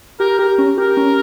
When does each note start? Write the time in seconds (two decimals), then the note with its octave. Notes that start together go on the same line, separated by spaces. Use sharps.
0.20 G4 A#4
0.39 G4 A#4
0.58 C#4
0.78 G4 A#4
0.97 C#4